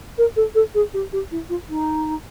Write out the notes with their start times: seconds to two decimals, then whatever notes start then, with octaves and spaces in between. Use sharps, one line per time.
0.18 A#4
0.36 A4
0.55 A4
0.74 G#4
0.94 G4
1.13 G4
1.31 E4
1.49 F4
1.69 D#4